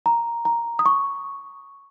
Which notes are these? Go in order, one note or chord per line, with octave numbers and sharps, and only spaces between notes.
A#5
A#5
D#6
C#6